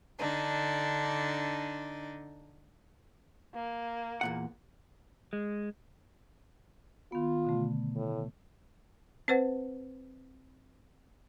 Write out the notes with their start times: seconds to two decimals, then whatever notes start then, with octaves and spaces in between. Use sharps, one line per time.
0.18 D3 D4 D#4
3.54 A#3
4.21 E2 A#2 F#5
5.33 G#3
7.12 D#3 B3 F4
7.45 B2 D3 A3
7.96 A2
9.28 C4 B4 C5 F#5